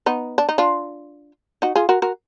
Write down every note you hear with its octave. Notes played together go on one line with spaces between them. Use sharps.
B3 D#4
D4
D#4
D4 F4
D#4 F#4
F4 G#4
F#4 A#4
F#4 A#4